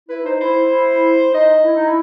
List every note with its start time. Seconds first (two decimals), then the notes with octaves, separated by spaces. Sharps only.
0.09 E4 B4
0.24 D#4 C5
0.40 E4 C5
0.71 E4
1.33 D#4 D#5
1.65 E4
1.75 D#4
1.85 E4